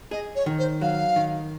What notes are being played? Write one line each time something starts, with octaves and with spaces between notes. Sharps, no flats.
G#4 D#5
C#5
D#3
C5
F#3 F5
D#3